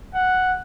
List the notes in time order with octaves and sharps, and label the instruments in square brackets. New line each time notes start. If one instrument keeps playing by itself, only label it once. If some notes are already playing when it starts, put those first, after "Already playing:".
[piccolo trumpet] F#5